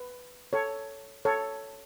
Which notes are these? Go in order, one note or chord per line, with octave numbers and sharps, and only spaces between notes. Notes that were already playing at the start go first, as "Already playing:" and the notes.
Already playing: B4
A4 C#5
A4 C#5